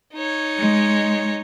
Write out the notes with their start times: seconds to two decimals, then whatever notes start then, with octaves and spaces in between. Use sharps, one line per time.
0.14 D#4 C#5
0.58 G#3